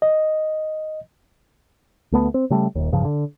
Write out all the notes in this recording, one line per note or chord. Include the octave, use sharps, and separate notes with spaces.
D#5
D2 A3 B3
C4
C#3 G3 A3
D#1 G#1 D#2
D1 G2 C#3 F3
D3